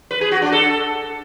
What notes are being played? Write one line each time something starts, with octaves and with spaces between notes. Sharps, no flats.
B4
G#4
F#4
D4
A4